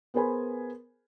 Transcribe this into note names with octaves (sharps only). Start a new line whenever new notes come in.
B3 G#4 A#4 C5 G#5 B5